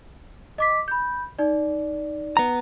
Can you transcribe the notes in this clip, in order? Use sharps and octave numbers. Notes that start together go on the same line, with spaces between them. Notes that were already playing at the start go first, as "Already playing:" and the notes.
D#5 D6 B6
B5 G6
D#4 D5
B3 A#5